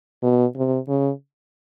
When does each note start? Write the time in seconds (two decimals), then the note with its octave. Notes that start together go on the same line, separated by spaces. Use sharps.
0.23 B2
0.56 C3
0.88 C#3